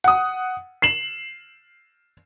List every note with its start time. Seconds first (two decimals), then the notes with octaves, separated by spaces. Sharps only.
0.04 F#5 D#6
0.82 C7 E7 F#7